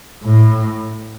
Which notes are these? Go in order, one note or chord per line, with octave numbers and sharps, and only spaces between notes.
A2